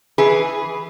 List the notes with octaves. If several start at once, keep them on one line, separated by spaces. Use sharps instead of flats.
E3 G#4 B4